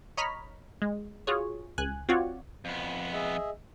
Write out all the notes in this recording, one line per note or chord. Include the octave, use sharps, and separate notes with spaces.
C#5 D#5 A#5 B5 F6 B6
G#3
F4 F#4 G#4 C#5
C#2 G#5 F#6
C4 F4 F#4 C#5 D5 F#5
F2 B3
G#4 D#5 E5